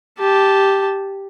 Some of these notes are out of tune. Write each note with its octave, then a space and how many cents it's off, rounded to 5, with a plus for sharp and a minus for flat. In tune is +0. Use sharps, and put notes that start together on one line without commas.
G4 +0 A5 -10